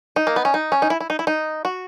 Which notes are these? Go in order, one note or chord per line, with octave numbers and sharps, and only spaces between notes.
D#4
A#3
B3
C#4
D#4
C#4
D#4
E4
E4
D#4
E4
D#4
F#4